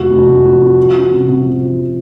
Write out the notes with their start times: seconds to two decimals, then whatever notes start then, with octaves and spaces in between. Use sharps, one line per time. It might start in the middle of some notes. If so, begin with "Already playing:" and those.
Already playing: F1 F3 F#4
0.11 F1
0.28 F1
0.44 F2
0.61 F2
0.77 F3
0.94 C#4
1.11 C3
1.28 C3
1.43 F3
1.60 F3